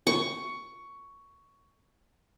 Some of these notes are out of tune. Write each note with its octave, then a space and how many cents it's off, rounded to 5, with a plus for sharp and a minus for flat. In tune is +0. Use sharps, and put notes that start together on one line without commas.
C#6 +10